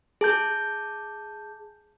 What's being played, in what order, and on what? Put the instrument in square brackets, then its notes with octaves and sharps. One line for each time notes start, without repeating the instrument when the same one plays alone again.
[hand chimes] G#4 A5 G6